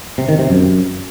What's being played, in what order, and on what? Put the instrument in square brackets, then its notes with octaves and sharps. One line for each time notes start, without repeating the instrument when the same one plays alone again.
[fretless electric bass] C3
D#3
C3
F#2